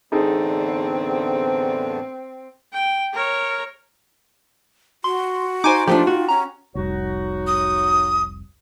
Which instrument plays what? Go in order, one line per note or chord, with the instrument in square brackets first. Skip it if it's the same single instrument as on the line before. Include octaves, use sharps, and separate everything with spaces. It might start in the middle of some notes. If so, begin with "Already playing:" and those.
[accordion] E2 A2 D3 [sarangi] C4 [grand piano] D#4 G#4 A4
[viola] G5
A#4 C#5
[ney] F#4 [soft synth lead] C6
[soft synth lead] D#4 [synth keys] C5 G#5 D6
[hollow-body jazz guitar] F3 A3 D4 [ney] F4 [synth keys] G4
[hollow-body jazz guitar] F#4
[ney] C#4 [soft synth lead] A#5
[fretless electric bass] F1 C2 [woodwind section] F#3 D#4 F#4
[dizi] D#6